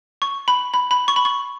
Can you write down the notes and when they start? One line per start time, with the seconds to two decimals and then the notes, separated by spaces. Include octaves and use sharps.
0.22 C#6
0.48 B5
0.74 B5
0.91 B5
1.08 C#6
1.16 B5
1.25 C#6